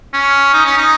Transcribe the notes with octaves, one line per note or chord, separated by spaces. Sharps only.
C#4
D#4
C#4
D#4